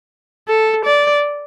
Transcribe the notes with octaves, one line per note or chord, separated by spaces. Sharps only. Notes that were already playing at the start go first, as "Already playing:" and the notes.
A4
D5